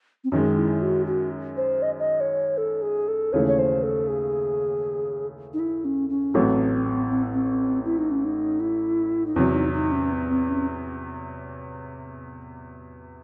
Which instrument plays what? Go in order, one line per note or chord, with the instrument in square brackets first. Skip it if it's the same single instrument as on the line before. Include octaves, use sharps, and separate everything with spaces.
[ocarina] C4
[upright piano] F#2 D#3 G#3 [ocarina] C#4
[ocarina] E4
F#4
F#4
C5
D#5
D#5
C#5
A4
G#4
A4
[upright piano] D#2 C#3 E3 A3 [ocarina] C#5
[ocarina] C#5
C5
A4
G#4
D#4
E4
C#4
C#4
[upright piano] A1 A2 F#3 A3 [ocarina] C4
[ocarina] C4
C4
E4
D#4
C#4
D#4
E4
D#4
[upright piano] E2 C3 F#3 [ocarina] E4
[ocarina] D#4
D#4
C#4
C4
C4
C#4